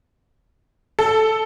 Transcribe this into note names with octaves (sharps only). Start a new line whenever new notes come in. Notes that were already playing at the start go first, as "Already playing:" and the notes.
A4